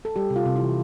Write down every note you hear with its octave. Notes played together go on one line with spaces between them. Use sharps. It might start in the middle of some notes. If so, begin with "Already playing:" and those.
A4
G3 G4
C3
F4
C3
E4
E3